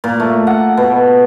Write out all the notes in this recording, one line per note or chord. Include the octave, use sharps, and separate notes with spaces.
A#2
A3
F#5
B2